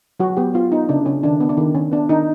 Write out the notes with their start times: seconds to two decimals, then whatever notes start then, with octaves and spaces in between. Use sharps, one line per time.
0.20 F#3 F#4
0.37 B3 G4
0.54 B3 F4
0.72 B3 D#4
0.89 C#3 D4
1.06 C#3 C#4
1.23 D#3 D4
1.41 B3
1.49 D4
1.57 D#3
1.74 D#3 C#4
1.92 B3 D4
2.09 D#3 D#4